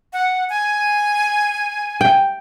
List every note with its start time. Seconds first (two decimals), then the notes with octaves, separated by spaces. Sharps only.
0.13 F#5
0.50 G#5
2.01 G5